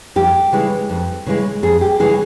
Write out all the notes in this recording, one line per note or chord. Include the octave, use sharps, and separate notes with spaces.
F2 G4
C#3 E3 G#3
F2
C#3 E3 G#3
F2 G#4
G4
C#3 E3 G#3 G#4